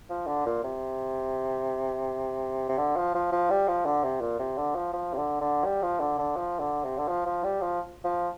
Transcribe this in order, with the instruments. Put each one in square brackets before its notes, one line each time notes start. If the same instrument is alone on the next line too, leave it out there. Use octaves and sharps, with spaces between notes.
[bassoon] F3
D3
A#2
C3
C3
D3
F3
F3
F3
G3
F3
D3
C3
A#2
C3
D3
F3
F3
C3
D3
D3
G3
F3
D3
D3
F3
D3
C3
D3
F3
F3
G3
F3
F3